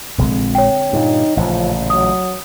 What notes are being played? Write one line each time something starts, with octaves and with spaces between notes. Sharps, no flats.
A#1 D3 G#3 C4
C#5 G5
G2 A#2 D#4
A1 A#2 C#3 F3
F#3 D#6